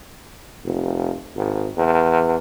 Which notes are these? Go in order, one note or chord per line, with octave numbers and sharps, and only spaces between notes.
F1
G#1
E2